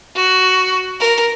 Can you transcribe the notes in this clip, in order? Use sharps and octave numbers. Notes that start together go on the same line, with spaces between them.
F#4
A#4